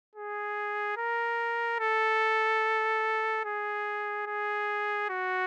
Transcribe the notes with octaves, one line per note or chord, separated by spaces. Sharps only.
G#4
A#4
A4
G#4
G#4
F#4